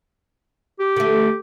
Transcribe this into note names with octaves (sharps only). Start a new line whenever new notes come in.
G4
D3 A3